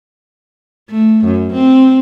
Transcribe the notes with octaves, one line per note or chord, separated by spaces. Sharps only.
A3
F#2
C4